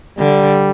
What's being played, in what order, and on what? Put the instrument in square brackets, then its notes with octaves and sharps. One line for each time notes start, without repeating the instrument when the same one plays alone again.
[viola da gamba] D3 [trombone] G3